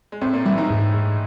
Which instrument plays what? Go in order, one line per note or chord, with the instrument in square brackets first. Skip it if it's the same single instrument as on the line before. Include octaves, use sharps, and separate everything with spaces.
[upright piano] G#3
[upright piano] A2 A3 [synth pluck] C4
[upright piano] A#2 A#3
[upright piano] E3 E4 [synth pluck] G3
[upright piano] D#3 D#4
[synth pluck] G#2
G#2